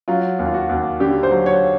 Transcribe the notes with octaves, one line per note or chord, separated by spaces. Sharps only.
F#3 F4
D#2
F4
F#4
D#2
D3 G4
C5
F#3
C#5